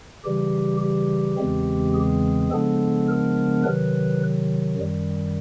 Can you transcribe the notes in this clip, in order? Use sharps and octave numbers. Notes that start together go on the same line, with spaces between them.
C#3 E3 G3 G4
G4
E2 C#3 E3 G#3 C4
G#4
C#3 F3 G#3 B3 D4 A4
A#4
C3 D#3 F#3 B4
F#2 D#3 G3